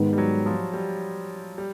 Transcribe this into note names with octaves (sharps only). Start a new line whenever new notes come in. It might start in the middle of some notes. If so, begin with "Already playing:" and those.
Already playing: G#2 D#3 G#3 B3
G3
F#3
F3
G3
G3